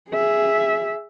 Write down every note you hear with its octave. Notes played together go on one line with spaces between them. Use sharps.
G#4 E5